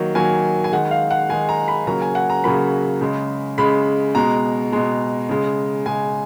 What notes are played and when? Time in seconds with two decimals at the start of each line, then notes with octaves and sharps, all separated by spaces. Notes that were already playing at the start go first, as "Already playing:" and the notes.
Already playing: D#3 F#3 A#3
0.15 D#3 F#3 A#3 G#5
0.64 G#5
0.73 D#3 G#3 F#5
0.91 F5
1.11 F#5
1.29 D#3 G#3 G#5
1.49 A#5
1.68 B5
1.87 C#3 F#3 A#3 A#5
2.01 G#5
2.15 F#5
2.30 A#5
2.44 C#3 F#3 A#3 B5
3.01 C#3 G#3
3.58 C#3 G#3 B5
4.15 B2 G#3 A#5
4.72 B2 G#3
5.29 C#3 G#3
5.86 C#3 G#3 G#5